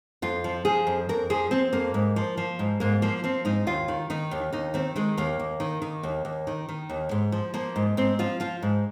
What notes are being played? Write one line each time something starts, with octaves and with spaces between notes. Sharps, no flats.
F2 F4
F3
F3 G#4
F2
F2 A#4
F3 G#4
F3 C4
F2 A#3
G#2
F3
F3
G#2
G#2 A#3
F3 A#3
F3 C4
G#2 D#4
D#2 F4
D#3
D#3 D#4
D#2
D#2 D#4
D#3 C4
D#3 G#3
D#2 A#3
D#2
D#3
D#3
D#2
D#2
D#3
D#3
D#2
G#2
F3
F3 A#3
G#2
G#2 C4
F3 F4
F3 F4
G#2